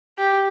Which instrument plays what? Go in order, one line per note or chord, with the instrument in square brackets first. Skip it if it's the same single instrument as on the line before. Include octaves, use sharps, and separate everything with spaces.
[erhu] G4